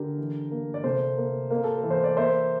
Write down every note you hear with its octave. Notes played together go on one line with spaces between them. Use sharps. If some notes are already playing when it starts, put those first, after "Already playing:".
Already playing: D3 G4 A#4
E3
A#3
D5
C3 A4 C5
A#3
A#3
A4
A#4
E3
C5
D5
A#3 C5 E5